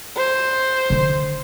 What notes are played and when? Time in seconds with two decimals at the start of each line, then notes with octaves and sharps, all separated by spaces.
0.16 C5
0.90 D3 D#3